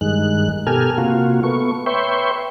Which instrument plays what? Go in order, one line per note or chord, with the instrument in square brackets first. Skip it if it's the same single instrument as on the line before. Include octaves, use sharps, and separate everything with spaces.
[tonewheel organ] G2 D#3 G#3 F#6
B2 G4 A4 A#4 G#5 F6
C3 A#3 F4 F#4
A3 B3 C#6
B4 C#5 E5 G5 C6 C#6